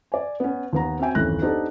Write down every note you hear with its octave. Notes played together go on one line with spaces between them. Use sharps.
D5 G#5
B3 C#4
D#2 B3 A#5
C4 C#4 F#4 E5 G5 G#5
D#1 G#1 F#2 E3 F#6 A#6
B3 D4 D#4 G4 A4 C5